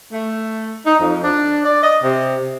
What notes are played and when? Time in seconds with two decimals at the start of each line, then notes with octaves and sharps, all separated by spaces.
0.13 A3
0.86 D#4
1.00 F2
1.24 D4
1.65 D5
1.83 D#5
2.04 C3